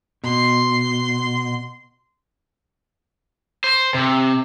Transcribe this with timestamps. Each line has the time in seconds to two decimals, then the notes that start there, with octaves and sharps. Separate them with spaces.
0.24 B2 C6
3.64 C5
3.94 C3